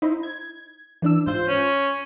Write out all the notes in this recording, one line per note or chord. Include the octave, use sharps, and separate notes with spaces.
D#4 E4 C5
G#6
E3 D4 E6
G#2 F4 C5
C#4